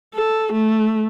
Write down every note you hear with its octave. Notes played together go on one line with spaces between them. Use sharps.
A4
A3